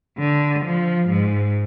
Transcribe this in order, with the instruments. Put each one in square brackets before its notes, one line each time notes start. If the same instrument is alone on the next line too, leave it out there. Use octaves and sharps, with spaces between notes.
[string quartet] D3
F3
G#2